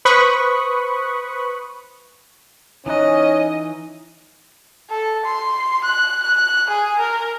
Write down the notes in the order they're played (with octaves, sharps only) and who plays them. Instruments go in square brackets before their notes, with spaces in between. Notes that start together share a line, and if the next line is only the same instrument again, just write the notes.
[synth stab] B4 C5 B5 C#6 D#6 F#6
[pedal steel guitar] E3 D#4 F#6 [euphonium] C#4 [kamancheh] D#5
[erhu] A4
C6
F#6
F#6
G#4
A#4